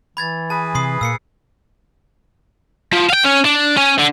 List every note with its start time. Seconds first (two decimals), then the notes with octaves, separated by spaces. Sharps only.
0.17 E3 B5 G#6 A6
0.50 G#4 B4 A5
0.75 C3 C6 D#6 C7
1.01 A#2 A#3 E6 C7 C#7
2.93 F3
3.09 F5 G5
3.24 C#4
3.45 D4
3.77 C#4
3.99 D3